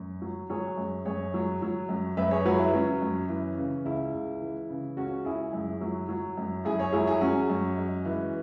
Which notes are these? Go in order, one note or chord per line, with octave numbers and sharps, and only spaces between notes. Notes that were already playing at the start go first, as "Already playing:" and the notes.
Already playing: F#2
F#3
F#3 G#4 C#5
F#2
F#2 G#4 C#5
F#3
F#3
F#2
F#2 B4 E5
G#4 C#5
F#3 F#4 B4
E4
F#3 C#4
F#2
E3
C#3
C#2 E4
C#2
E3
C#3
C#2 C#4 F#4
C#2 E4 G#4
F#2
F#3
F#3
F#2
F#2 E4 G#4
G#4 C#5
F#3 E4 G#4
E4 G#4
F#3 C#4 F#4
F#2
G#3
E3